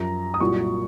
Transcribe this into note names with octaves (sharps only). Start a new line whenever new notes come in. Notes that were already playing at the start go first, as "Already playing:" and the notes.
Already playing: F#2 F3 A#5
D#6
C2 A#2 F#3 C#6